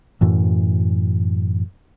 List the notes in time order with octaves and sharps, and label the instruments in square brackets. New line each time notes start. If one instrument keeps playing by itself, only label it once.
[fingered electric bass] F#2 A2 E3